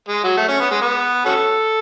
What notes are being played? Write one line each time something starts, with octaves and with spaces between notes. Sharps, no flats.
G#3
F#3
A3
C#4
B3
G#3
B3
C#4 F#4 A4